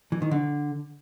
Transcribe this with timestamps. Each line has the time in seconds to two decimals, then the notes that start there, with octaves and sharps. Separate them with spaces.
0.12 E3
0.22 D#3
0.31 D3